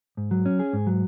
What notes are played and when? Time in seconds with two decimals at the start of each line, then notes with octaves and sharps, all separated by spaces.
0.17 G#2
0.31 F#3
0.46 C#4
0.59 G#4
0.73 G#2
0.87 F#3